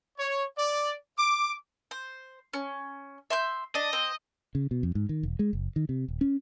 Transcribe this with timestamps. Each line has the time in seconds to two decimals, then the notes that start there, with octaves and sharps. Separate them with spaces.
0.18 C#5
0.58 D5
1.18 D6
1.91 C5
2.53 C#4
3.30 E5 C6 G6
3.75 D4 D#5
3.93 C4
4.55 C#3
4.71 B2
4.83 F2
4.95 G#2
5.09 D#3
5.23 E1
5.39 G#3
5.53 F#1
5.76 D#3
5.89 C3
6.08 D#1
6.21 C#4